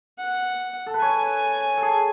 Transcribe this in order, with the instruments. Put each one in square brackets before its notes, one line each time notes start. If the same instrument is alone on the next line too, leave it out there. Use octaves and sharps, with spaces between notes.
[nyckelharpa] F#5
[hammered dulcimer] A4
B4
[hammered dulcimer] C#5 [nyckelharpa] G#5
[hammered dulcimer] A4
G#4